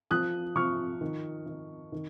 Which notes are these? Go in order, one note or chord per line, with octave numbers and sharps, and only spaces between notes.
F3 D#6 F#6
F3 C#6 F6
D#3
D#3
D#3